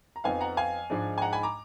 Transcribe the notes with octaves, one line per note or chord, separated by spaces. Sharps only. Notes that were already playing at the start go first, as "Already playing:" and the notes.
A#5
F2 F3 B3 D#4 F5 G#5
F#5 A#5
F5 G#5
G#2 F3 G#3 D4
G#5
F#5 A#5
G#5 B5
A#5 D6